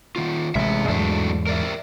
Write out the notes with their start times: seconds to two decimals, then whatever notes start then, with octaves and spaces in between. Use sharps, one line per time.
0.16 D#3 A#3 F4
0.55 A1 C3 G#3 G#4 E5
0.88 E2 G#2 F#3 A3 D4
1.47 A#4 D5 E5